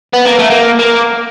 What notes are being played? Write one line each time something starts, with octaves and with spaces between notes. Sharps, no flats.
B3
A#3
A3
A#3
A#3